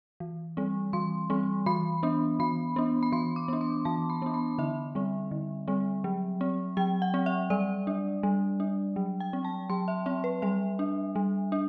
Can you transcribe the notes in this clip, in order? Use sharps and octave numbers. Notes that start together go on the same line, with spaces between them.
E3
G3 C4
E3 C6
G3 C4
E3 B5
B3 D4
E3 B5
B3 D4
B5
E3 C6
D6
B3 D4
C6
E3 A5
B5
B3 D4
B5
D3 E5
G3 C4
D3
G3 C4
F#3
C4
F#3 G5
F#5
C4
E5
G3 D5
D4
G3
D4
F#3
G5
C4
A5
F#3 C6
E5
C4 E5
B4
G3 E5
D4
G3
D4